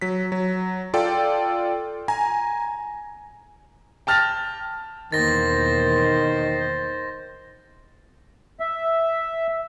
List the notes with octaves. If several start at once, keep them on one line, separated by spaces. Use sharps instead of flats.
F#3 B6
F#3
F4 A4 D5 G5
G#5 A#5
G5 A5 F6 A6 A#6 F7
E2 B2 D#3 A#3 C5 A6 A#6
E5